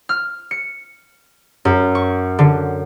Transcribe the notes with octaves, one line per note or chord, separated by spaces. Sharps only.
F6
C#7
F#2
C#6
D3